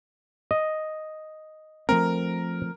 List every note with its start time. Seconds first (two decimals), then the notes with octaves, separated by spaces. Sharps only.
0.51 D#5
1.89 F3 A3 C4 A#4